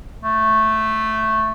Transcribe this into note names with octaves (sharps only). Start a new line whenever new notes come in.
A3